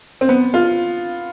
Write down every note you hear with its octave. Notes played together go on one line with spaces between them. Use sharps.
C4
B3
F4